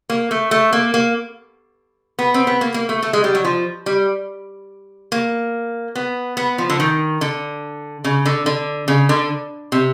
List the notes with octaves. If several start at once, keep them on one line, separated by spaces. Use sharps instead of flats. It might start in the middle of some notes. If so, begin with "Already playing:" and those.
A#3
A3
A3
A#3
A#3
B3
C4
B3
A#3
A#3
A3
A3
G#3
G3
F#3
F3
G3
A#3
B3
B3
F3
D3
D#3
D3
C#3
D3
D3
C#3
D3
C3